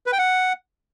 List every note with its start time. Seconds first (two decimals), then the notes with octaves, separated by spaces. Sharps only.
0.06 B4
0.13 G5
0.19 F#5